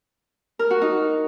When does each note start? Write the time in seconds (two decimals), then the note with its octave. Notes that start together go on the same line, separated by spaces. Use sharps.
0.59 A#4
0.70 F#4
0.82 D#4